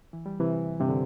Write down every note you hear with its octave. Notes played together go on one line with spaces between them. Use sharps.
E3
G3
C3 E3
G2 C3
D3